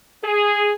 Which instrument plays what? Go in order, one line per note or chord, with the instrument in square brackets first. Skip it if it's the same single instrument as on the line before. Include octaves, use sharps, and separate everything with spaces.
[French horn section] G#4